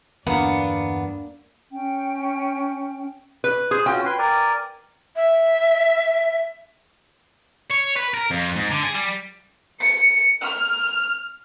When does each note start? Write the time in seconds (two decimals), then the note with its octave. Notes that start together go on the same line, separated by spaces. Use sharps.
0.27 E2 G2 D3 A#3 B3 D4
1.72 C#4 G5
3.44 B4
3.71 G#4 C5
3.86 C#4 F4 F#4 G5
4.06 B4 G#5 C6
4.19 A#4 D5 G#5
5.16 E5
7.71 C#5
7.96 B4
8.14 A#4
8.31 F2
8.56 G#2
8.71 D3
8.83 G#4
8.95 G3
9.82 C#7
10.44 F6